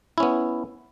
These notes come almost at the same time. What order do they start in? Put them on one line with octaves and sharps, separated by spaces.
E4 C#4 B3